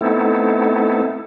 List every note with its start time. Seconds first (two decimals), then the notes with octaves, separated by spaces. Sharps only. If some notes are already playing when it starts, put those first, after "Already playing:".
0.01 A3 B3 C4 D#4 E4 A4